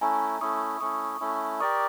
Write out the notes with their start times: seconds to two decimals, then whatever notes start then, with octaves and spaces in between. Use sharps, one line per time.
0.01 A3 C#4 E4 G#5 A#5
0.41 A3 C#4 E4 C#6 D#6
0.81 A3 C#4 E4 C#6 D#6
1.20 A3 C#4 E4
1.60 G4 A#4 D5 C#6 D#6